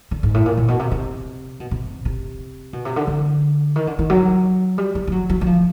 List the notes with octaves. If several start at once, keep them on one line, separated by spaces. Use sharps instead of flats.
D3
G#2
A2
A#2
A#2
B2
C3
C3
B2
C3
C3
B2
C3
D3
D3
D#3
D3
D#3
F#3
G3
G3
G3
F#3
F#3
F#3
F3